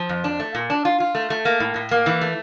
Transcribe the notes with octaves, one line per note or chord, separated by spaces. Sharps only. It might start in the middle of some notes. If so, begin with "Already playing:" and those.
Already playing: F3
F2
D4
A3
A#2
D4
F4
F4
A3
A3
A#3
A2
A2
A#3
E3
A3